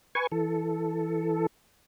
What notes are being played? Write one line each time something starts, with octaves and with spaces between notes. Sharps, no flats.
B4 G#5 C#6
E3 A4